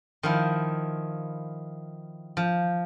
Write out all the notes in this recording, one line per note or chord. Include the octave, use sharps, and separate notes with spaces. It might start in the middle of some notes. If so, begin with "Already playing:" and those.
D#3 F3 E4
F3